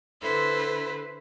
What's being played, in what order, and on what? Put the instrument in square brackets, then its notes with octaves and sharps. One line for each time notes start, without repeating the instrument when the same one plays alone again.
[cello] D3 B4 [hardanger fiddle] E4 C5 [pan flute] A4